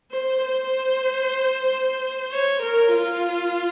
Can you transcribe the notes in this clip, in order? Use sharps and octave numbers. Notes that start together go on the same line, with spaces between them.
C5
C5
C#5
A#4
F4